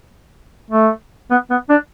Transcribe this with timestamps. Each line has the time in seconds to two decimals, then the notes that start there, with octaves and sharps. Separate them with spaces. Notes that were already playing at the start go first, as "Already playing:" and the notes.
0.71 A3
1.30 B3
1.50 B3
1.70 D4